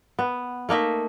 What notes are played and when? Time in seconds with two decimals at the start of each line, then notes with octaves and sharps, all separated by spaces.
0.19 B3
0.69 A3 A#3 D#4 E5